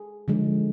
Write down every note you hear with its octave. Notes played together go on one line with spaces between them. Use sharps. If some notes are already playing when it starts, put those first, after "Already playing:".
Already playing: G#4
D3 F3 G#3